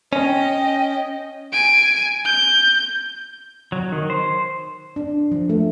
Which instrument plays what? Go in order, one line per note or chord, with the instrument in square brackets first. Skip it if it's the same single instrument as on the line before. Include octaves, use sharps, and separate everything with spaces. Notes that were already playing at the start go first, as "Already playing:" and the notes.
[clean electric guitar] C#4 [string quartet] D#5 G5
[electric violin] G#5 D7
G6
[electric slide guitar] F#3
D#3
C5
[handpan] D4
F3
A3